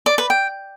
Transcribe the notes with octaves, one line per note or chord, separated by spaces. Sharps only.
D5
B4
G5